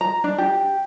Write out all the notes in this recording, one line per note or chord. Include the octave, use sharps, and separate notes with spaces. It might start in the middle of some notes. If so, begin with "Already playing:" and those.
A#5
D4
G4